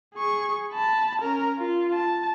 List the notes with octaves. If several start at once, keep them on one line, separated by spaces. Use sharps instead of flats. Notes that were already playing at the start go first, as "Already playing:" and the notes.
G#4 C#6
A5 B5
C#4 A#4
F4
A5